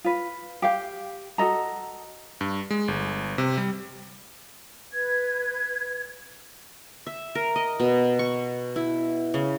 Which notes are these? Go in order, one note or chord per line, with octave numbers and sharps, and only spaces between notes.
F4 B4
G4 F5 G5
F#4 A4 D#5 A#5
G2
G#3
G1
C3
G3
B4 G#6
E5
A#4
D#5
B2
C#6
E4
C#3